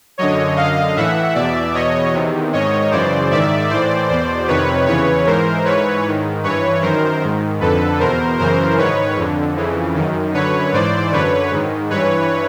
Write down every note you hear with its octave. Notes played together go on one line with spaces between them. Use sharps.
F#2 D3 C#5 D#5
F#2 D3 D#5 F5
A2 E3 E5 F#5
E2 B2 D5 E5
E2 B2 C#5 D#5
E2 C3 D#3
G#2 D#3 C#5 D#5
F#2 C#3 E3 C5 D5
G#2 D#3 D5 E5
A2 E3 C5 D5
E2 B2 C5 D5
F2 C3 D#3 B4 C#5
E2 C#3 E3 B4 C#5
G#2 E3 A#4 C5
G#2 E3 B4 C#5
G#2 D#3
G2 E3 B4 C#5
F#2 D#3 A#4 C5
G#2 D#3
F2 D3 A4 B4
E2 B2 A#4 C5
F#2 C#3 E3 A#4 C5
G#2 D#3 B4 C#5
F2 D3
F2 C#3 E3
F#2 D#3
F#2 D3 B4 C#5
G#2 E3 C5 D5
F#2 D3 B4 C#5
G#2 D#3
G2 E3 B4 C#5